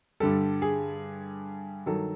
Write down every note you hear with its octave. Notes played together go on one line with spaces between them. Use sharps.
G2 D3 G3 A4
G#4
G2 D#3 F#3 A4